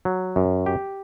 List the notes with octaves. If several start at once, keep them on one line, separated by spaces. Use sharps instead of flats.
F#3
F#2
G4